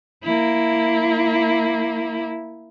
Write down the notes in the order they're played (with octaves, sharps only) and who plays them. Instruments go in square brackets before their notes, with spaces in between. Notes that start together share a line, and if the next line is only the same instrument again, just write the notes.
[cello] A#3 E4